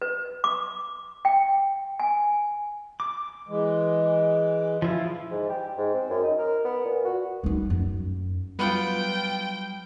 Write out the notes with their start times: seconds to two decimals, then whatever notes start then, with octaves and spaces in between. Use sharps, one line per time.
0.02 B4
0.44 D6
1.25 G5
2.00 G#5
3.00 D6
3.48 E3 G#3
4.82 F3 E4 F4
5.31 G#2
5.49 G4
5.77 G#2
5.94 C4
6.10 F#2
6.23 D#4
6.38 A#4
6.65 B3
6.85 A#2
7.05 F#4
7.44 G3 D#4
7.70 F#2
8.59 F#3 G3 B3 F4 G5